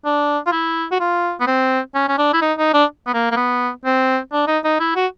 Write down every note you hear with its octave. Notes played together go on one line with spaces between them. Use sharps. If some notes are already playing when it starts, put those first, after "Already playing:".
D4
F4
E4
F#4
F4
B3
C4
C#4
C#4
D4
E4
D#4
D#4
D4
B3
A#3
A#3
B3
C4
D4
D#4
D#4
E4
F#4